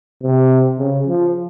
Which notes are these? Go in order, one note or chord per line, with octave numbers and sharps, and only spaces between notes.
C3
C#3
F3